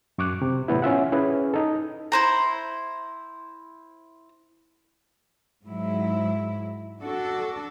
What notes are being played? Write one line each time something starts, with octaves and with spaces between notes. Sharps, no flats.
F#2 C#6 D6 F#6
C3
A2 E3 B3 E4
C#4 F4 E5 F#5
C#4 E4 G#4 B4
D#4 A4
E4 C5 A#5
G#2 F#3 E4
D4 F#4 A4